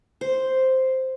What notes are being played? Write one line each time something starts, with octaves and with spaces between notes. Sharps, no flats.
C5